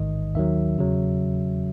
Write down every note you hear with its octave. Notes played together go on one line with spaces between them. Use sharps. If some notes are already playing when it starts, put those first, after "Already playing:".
Already playing: A1 G#2 D#3 D#5
D#2 D#3 F#3 E5
E2 C#3 F#3